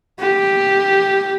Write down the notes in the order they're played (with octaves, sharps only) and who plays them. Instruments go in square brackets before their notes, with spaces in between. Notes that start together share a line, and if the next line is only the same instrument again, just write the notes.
[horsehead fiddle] G4